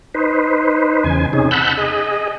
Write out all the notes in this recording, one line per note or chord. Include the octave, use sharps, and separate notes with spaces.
D#4 B4 C5
E2 C#3 G#5
C3 C#4 D#4 G#4
F#5 A5 B5 E6 F#6 G6
G#4 D#5